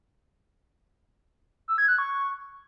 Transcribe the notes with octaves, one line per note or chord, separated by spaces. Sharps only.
E6
G#6
F#6
C#6